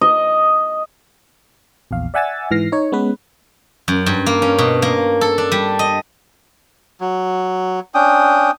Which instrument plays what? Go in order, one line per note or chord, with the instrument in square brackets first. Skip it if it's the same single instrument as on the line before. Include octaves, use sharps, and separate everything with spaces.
[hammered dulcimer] D#5
[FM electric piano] A#1 E2 F5
D5 E5 F#5 G#5 E6 A6
G#2 E3 F6 A#6 C7
D#4 C#5
G#3 B3 C#4 B4
[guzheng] F#2
G2
A#3
C#4
B2
A#3
A4
D4
G3
D#5
[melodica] F#3
C#4 D4 G5 D#6